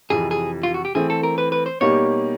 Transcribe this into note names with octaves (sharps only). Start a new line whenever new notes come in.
F2 C3 E3 G#4
G#4
F4
F#4
G4
E3 A3 C4 G#4
A4
A#4
B4
B4
C5
B2 G3 A#3 D#4 G4 C#5